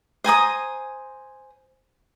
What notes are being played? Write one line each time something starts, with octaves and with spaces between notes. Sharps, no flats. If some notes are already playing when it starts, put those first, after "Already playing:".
C5 G#5 A#5 D#6